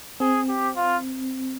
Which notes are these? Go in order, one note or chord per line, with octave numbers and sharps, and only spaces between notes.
C4 G#4
G4
F4